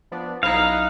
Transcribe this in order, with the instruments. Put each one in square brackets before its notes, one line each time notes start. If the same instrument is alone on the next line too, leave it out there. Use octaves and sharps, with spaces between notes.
[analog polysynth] F3 B3 D4
[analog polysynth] B1 E4 F#6 [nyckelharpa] D#4 [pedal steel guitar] F5